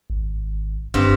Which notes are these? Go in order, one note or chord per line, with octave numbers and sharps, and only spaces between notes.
G#1
F1 G2 C4